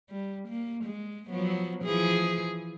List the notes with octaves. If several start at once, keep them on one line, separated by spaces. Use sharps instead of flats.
G3
A#3
G#3
F3 F#3 B3
E3 F3 G#4